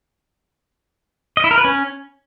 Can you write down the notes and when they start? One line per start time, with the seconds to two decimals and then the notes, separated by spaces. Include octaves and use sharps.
1.37 D#5
1.44 E4
1.51 A#4
1.58 B4
1.65 C#4